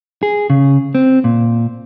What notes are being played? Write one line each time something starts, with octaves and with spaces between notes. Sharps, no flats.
G#4
C#3
C4
A#2